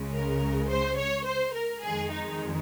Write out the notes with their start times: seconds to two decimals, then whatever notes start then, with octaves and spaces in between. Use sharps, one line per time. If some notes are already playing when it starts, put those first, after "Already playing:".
Already playing: C#2 C#3 G#3
0.13 A#4
0.69 C5
0.98 C#5
1.26 C5
1.55 A#4
1.83 F2 D#3 G#3 G#4
2.11 D#4